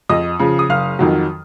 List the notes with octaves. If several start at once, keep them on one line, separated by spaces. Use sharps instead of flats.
F2 D#5 D#6
C#3 F3
D#6
F#1 F5 F6
F2 D#3 F#3